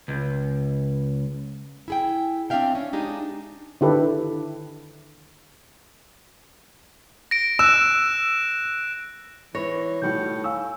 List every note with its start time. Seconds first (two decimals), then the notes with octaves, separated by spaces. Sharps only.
0.08 C#2
1.88 E4 G#4 G5
2.50 C4 D4 F4 E5 F5 G5
2.75 C#4
2.93 G#3 D4 D#4 G4 G#4
3.81 D3 D#3 E4 G4 A4 B4
7.31 A#6 D7
7.59 E6 F#6 E7
9.55 E3 C#5 A#6
10.02 A2 D#3 G3 F#4 G6 C#7
10.44 F5 G#5 C#6 E6